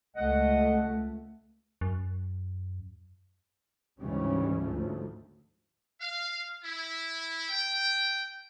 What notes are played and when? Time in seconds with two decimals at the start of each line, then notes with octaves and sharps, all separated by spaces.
0.16 C#2 A3 D#5 F#5
1.81 F#2
4.01 D2 G#2 C#3 E3 G3 C#4
4.61 D2 G#2 F3 A3
5.99 F5
6.64 E4
7.48 G5